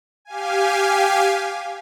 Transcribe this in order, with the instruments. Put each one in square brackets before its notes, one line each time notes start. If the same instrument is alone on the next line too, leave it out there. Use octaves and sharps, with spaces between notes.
[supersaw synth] G4 F5 G#5